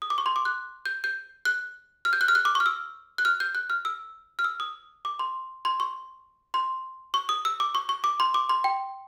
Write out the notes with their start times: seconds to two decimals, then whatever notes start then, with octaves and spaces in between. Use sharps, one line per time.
0.02 D#6
0.10 D6
0.18 C#6
0.26 C6
0.36 D6
0.45 F#6
0.86 G6
1.04 G6
1.45 F#6
2.05 F6
2.13 G6
2.21 F#6
2.28 F6
2.35 F#6
2.45 D6
2.55 C#6
2.60 F6
2.66 E6
3.18 F#6
3.25 F6
3.40 G6
3.55 F#6
3.70 F6
3.85 E6
4.39 F6
4.44 E6
4.60 D#6
5.05 D6
5.19 C6
5.65 C6
5.80 C#6
6.54 C6
7.14 C#6
7.29 D#6
7.45 E6
7.60 D6
7.75 C#6
7.89 C#6
8.04 D6
8.20 C6
8.34 D6
8.49 C6
8.64 G5